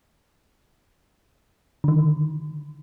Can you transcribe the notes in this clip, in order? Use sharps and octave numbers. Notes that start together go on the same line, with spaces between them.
D3 D#3